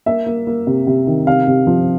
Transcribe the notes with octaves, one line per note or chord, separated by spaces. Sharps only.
A#3 E5
A#3
A#3
C3
C3
D#3
C3 F5
C3
F3